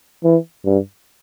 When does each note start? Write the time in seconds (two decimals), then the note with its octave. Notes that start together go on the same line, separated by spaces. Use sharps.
0.24 E3
0.65 G2